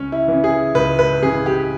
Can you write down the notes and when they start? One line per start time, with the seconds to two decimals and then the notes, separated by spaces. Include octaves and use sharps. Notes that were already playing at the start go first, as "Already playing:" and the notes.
Already playing: C#2 C#4
0.12 E4
0.28 C#3 E3
0.44 G#4
0.75 C#2 B4
0.99 B4
1.22 C#3 E3 G#4
1.46 G4